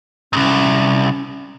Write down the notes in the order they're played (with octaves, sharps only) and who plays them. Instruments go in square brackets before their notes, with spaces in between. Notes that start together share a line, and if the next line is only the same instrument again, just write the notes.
[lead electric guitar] C2 G#2 [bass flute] C#4